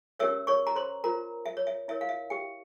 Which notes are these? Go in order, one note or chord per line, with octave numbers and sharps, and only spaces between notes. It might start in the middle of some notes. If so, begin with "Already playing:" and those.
C#4 G4 A#4 C#5 E5 E6
C#5 C#6
A#5
C5 C6
F4 A#4 C5 A#5
E5
C#5
E5
E4 A#4 C#5 E5
F5
E5
G4 G5